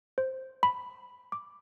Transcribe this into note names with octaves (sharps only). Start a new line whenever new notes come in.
C5
B5
D6